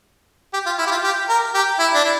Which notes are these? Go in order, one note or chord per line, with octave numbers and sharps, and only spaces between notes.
G4
F4
E4
G4
F4
G4
A#4
G4
E4
D4
E4